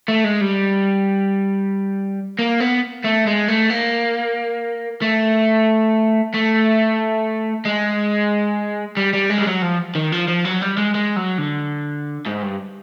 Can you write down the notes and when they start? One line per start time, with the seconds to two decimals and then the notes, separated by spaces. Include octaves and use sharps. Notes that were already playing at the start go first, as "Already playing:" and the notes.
0.08 A3
0.24 G#3
0.41 G3
2.39 A#3
2.60 B3
3.04 A3
3.26 G#3
3.48 A3
3.70 A#3
5.02 A3
6.34 A3
7.65 G#3
8.97 G3
9.13 G3
9.30 G#3
9.38 G3
9.46 F#3
9.62 F3
9.95 D#3
10.12 F3
10.28 F3
10.45 F#3
10.61 G3
10.77 G#3
10.95 G#3
11.16 F#3
11.38 D3
12.26 G#2
12.42 G2